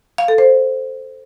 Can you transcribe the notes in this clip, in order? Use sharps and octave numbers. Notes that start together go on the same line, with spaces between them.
F5
A4
C5